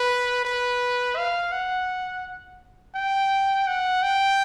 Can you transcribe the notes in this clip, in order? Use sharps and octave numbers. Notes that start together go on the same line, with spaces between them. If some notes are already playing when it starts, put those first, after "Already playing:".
Already playing: B4
B4
F5
F#5
G5
F#5
G5